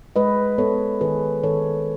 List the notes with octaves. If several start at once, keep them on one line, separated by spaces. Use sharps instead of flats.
G#3 B4 D#5
B3 A4 C#5
D#3 G#4 B4
D#3 A4 C#5